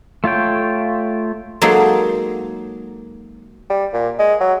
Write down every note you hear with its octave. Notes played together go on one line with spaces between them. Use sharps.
A3 F4 C#5 G5
F#3 G#3 A#3 D#4 A4 C5
G3
A#2
G#3
F#3